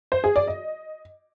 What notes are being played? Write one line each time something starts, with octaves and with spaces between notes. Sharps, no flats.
C5
G#4
D5
D#5